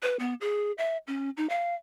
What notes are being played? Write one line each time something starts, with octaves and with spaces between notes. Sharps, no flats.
B4
B3
G#4
E5
C#4
D#4
F5